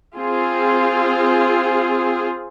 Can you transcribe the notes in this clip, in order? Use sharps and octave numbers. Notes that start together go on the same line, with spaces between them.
C4 F4 G#4